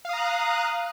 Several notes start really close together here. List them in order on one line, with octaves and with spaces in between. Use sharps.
F5 D#6 A#5 F#6